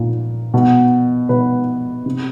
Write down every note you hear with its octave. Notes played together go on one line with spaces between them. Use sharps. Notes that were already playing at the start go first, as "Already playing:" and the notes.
Already playing: A#2
B2
B2 B4
C3